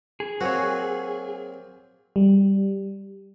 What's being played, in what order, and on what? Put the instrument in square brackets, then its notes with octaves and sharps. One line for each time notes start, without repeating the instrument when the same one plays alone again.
[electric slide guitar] G#4
[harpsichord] F#3 A#3 C4 [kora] F#4 C#5
[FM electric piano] G3